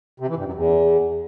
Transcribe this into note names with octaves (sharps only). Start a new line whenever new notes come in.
C3
E3
G2
F#2
E2